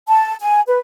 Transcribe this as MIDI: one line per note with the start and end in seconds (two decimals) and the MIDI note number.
0.08 0.35 81
0.41 0.61 80
0.68 0.79 71